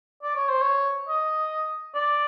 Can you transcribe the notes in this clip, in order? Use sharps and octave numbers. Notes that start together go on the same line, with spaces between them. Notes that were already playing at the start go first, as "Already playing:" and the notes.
D5
C#5
C5
C#5
D#5
D5